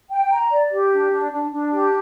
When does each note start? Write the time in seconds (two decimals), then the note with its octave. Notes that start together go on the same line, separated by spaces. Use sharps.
0.10 G5
0.31 A#5
0.51 D5
0.71 G4
0.91 D4
1.12 D4
1.32 D4
1.52 D4
1.72 G4